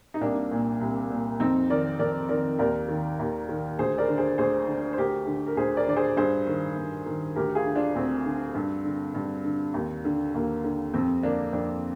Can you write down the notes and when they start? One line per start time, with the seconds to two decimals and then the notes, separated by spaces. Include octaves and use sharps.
0.14 D#4
0.21 C2 A#3 D4
0.51 A#2
0.81 C2
1.10 A#2
1.40 F2 C4 D#4
1.70 D#3 A#4 D5
1.99 F2 A#4 D5
2.29 D#3 A#4 D5
2.59 D#2 A#4 D5
2.88 D#3
3.19 D#2
3.49 D#3
3.79 D2 G#4 C5
3.98 A#4 D5
4.09 D3
4.18 G#4 C5
4.38 D2 G#4 C5
4.67 D3
4.93 C5
4.98 D2 G4 A#4
5.27 D3
5.47 A#4
5.57 D2 G#4 C5
5.77 A#4 D5
5.87 D3 D5
5.96 G#4 C5
6.17 G2 G#4 C5
6.47 D#3
6.76 G2
7.06 D#3
7.36 D2 G4 A#4
7.55 F4 G#4
7.65 D3
7.75 D4 F4
7.95 D2 C4
8.26 D3
8.55 G2
8.85 D3
9.14 G2
9.44 D3
9.74 D#2
10.05 D3
10.35 D#2 A#3
10.64 D3
10.94 F2 C4
11.23 D3 A#3 D4
11.53 F2 A#3 D4